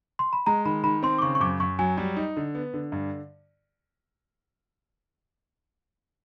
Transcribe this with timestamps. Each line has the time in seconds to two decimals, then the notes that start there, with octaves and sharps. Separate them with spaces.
0.19 C6
0.33 B5
0.46 G#3 A#5
0.65 D#3 B5
0.84 D#3 B5
1.03 C4 C6
1.18 D6
1.22 C#3 C#6
1.35 C#6
1.40 F#2 D6
1.60 F#2 C#6
1.79 F#3 G#5
1.98 G3
2.16 D#4
2.37 D3
2.55 B3
2.74 D3
2.92 G2